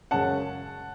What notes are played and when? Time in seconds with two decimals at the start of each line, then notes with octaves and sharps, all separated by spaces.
0.11 F#2 C#3 G#3 C#4 F#5 A5